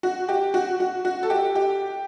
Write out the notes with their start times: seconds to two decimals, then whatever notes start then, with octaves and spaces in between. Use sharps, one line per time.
0.03 F#4
0.28 G4
0.54 F#4
0.80 F#4
1.05 F#4
1.23 A4
1.30 G4
1.55 G4